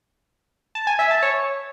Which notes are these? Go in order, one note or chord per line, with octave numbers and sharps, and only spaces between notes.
A5
G#5
E5
A5
C#5